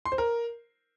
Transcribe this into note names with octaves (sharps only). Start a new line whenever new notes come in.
C6
C5
A#4